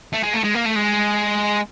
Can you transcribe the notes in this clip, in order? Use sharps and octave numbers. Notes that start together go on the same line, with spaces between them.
A3
G#3
A3
G#3
A#3
A3
G#3